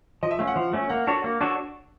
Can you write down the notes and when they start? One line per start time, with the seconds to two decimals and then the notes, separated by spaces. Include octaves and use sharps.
0.23 F3 D#5
0.31 E5
0.39 A3 C#4 F5
0.47 F#5
0.56 F3
0.73 A3 C#4
0.89 A#3 F#5
1.07 D4 F#4 A4 C#5
1.24 A#3
1.41 D4 F#4 A4 C#5